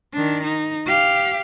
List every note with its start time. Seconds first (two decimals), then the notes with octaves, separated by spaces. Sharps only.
0.14 D#3 D4
0.44 D#4
0.87 G4 F5